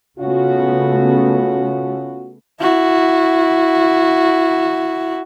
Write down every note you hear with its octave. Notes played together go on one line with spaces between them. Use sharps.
C#3 A3 B3 C#4 F4 F#4
E4 F#4